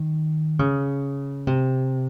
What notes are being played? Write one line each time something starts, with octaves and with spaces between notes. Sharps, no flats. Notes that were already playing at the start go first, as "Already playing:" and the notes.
Already playing: D#3
C#3
C3